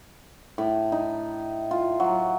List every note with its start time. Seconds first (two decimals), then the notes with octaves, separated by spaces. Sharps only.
0.58 A2
0.92 D#4
1.71 F4
2.00 F#3